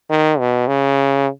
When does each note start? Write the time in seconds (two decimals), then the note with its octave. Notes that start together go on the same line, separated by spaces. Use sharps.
0.10 D#3
0.39 B2
0.68 C#3